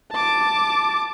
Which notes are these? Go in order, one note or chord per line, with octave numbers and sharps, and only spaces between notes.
A5 D6